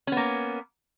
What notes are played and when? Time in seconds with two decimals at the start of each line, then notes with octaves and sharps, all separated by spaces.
0.07 C#4
0.12 B3
0.17 A#3